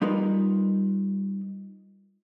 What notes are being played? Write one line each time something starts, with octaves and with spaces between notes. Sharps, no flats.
G3 D#4 F4 A#4 B4